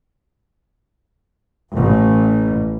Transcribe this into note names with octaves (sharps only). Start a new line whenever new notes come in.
A1